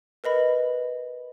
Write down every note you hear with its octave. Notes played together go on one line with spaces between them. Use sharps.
A#4 B4 D#5 B5